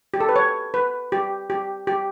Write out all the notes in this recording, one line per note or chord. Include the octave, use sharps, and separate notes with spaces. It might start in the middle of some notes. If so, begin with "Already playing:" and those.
G4
A4
B4
C#5
B4
G4
G4
G4